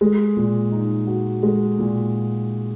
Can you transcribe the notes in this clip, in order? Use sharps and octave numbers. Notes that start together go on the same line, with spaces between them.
G#3
A#2
D#4
F#4
G#3
A#2